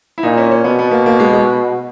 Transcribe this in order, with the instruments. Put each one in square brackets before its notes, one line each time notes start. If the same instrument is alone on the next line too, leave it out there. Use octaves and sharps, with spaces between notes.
[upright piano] E4
[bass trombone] A#2 [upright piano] D#4
[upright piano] C#4
C#4
[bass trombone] B2 [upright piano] B3
[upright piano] B3
A#3
A#3
G#3
G#3